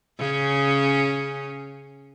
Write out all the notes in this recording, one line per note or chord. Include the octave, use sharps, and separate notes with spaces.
C#3 C#4